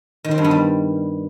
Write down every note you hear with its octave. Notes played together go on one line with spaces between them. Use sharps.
D#3
C4
G2
B3
G3